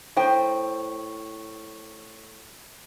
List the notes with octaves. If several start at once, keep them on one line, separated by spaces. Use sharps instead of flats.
A2 C5 G5